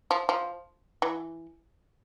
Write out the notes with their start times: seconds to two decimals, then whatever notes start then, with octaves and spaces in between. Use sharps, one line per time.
0.11 F3
0.29 F3
1.02 E3